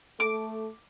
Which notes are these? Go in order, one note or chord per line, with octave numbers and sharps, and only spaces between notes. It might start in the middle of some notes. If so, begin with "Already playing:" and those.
A3 A4 D6